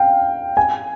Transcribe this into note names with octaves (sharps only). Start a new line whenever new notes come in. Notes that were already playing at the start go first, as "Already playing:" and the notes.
Already playing: F5 G5
G#5